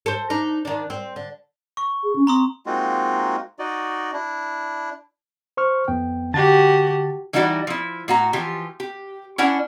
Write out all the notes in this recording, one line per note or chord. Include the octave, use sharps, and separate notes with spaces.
A4 C5
D4 D#4
D#3 D4
C4
D3
C#6
G#4
C#4
C4 A#5 C6 D#6
G#3 A#3 C4 D#4 F4 F#4
D#4 F#4 D5 D#5
D4 E4
C5 C#6 F6
F2 B3 G5
D3 F#4 G4 A5 A6
E3 G3 D#4 E4 F#4 D5
F3 E4
A2 F#4 A#5
E3 F3 G4
G4
C#4 D4 E4 F#5